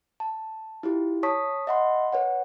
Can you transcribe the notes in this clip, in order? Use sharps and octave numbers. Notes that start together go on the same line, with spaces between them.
A5
E4 F4 G4
C#5 A5 C#6 D#6 B6
D#5 E5 F#5 B5 C6
B4 C#5 F#5